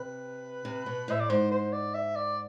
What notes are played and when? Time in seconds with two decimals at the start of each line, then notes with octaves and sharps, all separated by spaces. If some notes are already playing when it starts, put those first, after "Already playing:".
Already playing: C3 B4
0.65 C3
0.86 B2
1.08 A2 E5
1.20 D5
1.29 G#2 C5
1.51 C5
1.72 D5
1.95 E5
2.16 D5